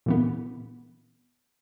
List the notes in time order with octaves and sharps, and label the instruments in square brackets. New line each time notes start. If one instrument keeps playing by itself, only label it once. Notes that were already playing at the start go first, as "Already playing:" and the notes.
[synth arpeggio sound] A#2 E3 B3